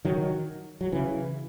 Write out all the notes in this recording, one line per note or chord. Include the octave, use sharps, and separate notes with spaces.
D#3 F#3
F#3
C#3 E3